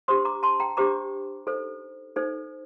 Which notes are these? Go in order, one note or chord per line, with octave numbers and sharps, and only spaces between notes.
D4 G4 C5 C6 D#6
A#5 D6
A5 C6
G5 A#5
D4 G4 C5 A#5 D6
D#4 A4 C5
D#4 A4 C5